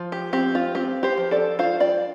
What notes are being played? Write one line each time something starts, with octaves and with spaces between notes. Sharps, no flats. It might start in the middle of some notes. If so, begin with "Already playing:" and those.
Already playing: F3
G4
C4 G4
F4
C4 G4
G4 C5
F3
A4 D5
F4 C5 F5
D5 G5